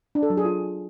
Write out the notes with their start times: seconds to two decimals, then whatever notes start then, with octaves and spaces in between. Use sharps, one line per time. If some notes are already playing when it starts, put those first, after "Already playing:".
0.15 D4
0.23 A4
0.30 F#3
0.37 G#4
0.45 F4